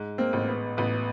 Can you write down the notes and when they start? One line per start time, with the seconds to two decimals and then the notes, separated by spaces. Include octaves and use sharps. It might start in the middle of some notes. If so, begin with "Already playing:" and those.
Already playing: G#2
0.18 A#3 C4
0.33 A1
0.48 B3
0.77 A1 B3